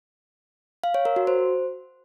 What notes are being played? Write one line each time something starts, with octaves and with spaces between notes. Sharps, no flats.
F5
C#5
A#4
F#4
C5